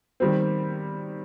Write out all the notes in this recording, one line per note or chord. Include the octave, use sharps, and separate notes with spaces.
D#3 G3 C4